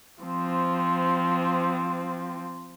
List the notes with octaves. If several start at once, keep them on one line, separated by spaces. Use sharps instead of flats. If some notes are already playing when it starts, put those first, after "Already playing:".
F3 C4